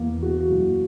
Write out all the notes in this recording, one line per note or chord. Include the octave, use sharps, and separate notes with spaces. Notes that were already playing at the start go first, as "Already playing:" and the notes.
Already playing: E2 A#3
E3 F#4
F#2